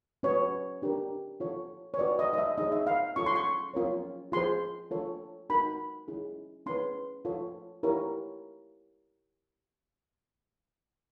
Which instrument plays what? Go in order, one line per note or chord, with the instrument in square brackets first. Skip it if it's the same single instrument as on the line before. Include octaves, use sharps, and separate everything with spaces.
[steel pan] C#4 F#4 B4 C#5
D4 G4 A#4
F4 A4 C#5
C#5
F#4 B4 D5
D#5
D#5
E5
D#4 G#4 C#5 D#5
E5
F5
C#4 F4 A4 C#6
C6
C#6
C#4 F4 A#4 C#5
F4 G#4 C5 C6
F4 A4 C#5
D#4 F#4 A#4 B5
C#4 E4 G#4
C#4 E4 G#4 B4 C6
F4 A4 C#5
E4 G4 A#4 C#5